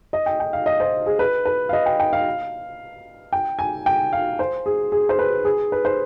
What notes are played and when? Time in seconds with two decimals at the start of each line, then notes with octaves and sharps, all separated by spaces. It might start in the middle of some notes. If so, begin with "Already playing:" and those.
0.13 D#5
0.26 G5
0.40 G5
0.53 F5
0.66 D#5
0.80 C5
1.06 G#4
1.19 B4
1.46 B4
1.69 F5
1.73 D#5
1.86 G5
2.00 G5
2.13 F5
3.33 G5
3.59 G#5
3.86 G5
4.13 F5
4.39 C5
4.66 G#4
4.92 G#4
5.09 C5
5.19 B4
5.45 G#4
5.72 B4
5.85 C5